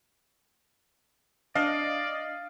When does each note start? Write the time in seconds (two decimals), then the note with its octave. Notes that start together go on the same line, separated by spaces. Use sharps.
1.55 D4 D5 D#5 F5